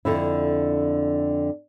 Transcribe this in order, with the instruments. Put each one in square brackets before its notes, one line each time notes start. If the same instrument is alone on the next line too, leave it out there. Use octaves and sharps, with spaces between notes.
[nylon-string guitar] F2 D3 E4